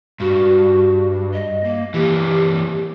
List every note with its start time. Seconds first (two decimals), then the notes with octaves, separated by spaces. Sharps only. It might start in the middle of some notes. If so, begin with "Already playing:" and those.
0.20 G2 F#4
1.33 D#5
1.64 A#3
1.94 E3 A#3 G4